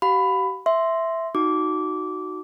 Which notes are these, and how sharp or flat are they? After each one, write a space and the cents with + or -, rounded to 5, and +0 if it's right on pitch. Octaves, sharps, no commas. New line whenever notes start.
G4 -40 F5 +30 B5 +15
E5 +0 C6 +0
D#4 +0 F#4 +0 D6 -15